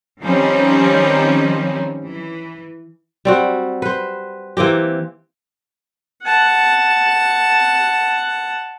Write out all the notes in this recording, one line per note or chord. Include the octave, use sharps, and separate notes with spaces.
D#3 F3 G3 C4 C#4 D#4
E3
G3 C4 F#4
B4 C5
E3 A#3 C4 G4
F#5 A5